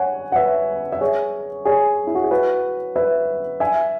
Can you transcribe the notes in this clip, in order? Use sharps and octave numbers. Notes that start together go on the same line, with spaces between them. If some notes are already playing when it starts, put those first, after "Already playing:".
Already playing: C#5 F#5 G#5
F#5
B4 E5
E5
G#4 C#5
G#4 C#5
E4
F#4
G#4
F#4 B4
B4 E5
E5 G#5